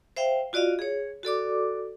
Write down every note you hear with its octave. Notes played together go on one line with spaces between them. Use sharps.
C5 E5 F5 G5
F4 F#4 D5 D#5 F5
G#4 C#5
F#4 A4 D5 D6